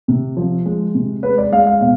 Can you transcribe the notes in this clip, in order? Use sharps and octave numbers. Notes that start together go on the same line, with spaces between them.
C3
F3
G#3
C3
G#3 B4
D5
G#3 F5
F5
B2 F5